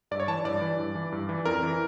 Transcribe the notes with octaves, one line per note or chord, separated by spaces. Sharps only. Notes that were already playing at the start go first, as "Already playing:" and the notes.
G2 D5
C#5
E3 A5
G2 D5
E3
G2
E3
G2
E3
F2 A#4
E3